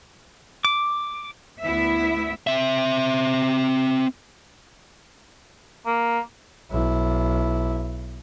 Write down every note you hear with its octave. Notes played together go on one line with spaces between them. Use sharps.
D6
D2 B3 E4 E5
C4 E5
A#3
B1 E4